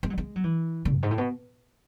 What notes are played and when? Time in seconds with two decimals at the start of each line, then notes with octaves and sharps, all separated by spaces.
0.03 G#3
0.10 F#3
0.18 G#3
0.36 F#3
0.44 E3
0.85 D3
0.95 F#2
1.03 G#2
1.11 A2
1.18 B2